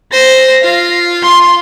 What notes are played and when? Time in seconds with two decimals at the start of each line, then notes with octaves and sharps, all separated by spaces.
0.12 C5 A#6
0.62 F4 F5
1.23 C6